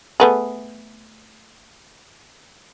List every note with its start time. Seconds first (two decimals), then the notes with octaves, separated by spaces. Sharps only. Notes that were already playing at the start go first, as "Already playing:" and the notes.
0.20 A3 B3 G#4